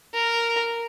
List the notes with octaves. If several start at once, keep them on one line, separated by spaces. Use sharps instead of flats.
A#4